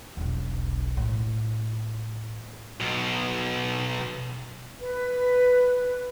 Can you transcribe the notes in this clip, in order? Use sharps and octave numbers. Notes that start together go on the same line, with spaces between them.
E1 B1
A2
B1 B2
B4